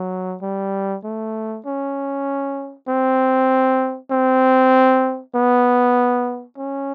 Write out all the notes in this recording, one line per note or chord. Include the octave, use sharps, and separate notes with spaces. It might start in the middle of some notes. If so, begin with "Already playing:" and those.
Already playing: F#3
G3
A3
C#4
C4
C4
B3
C#4